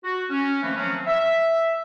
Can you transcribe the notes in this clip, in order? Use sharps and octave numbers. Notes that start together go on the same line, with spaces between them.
F#4
C#4
D#3 F3 A3 A#3 C4 B4
D#3 F3 F#3 A3 C4 C#4
E5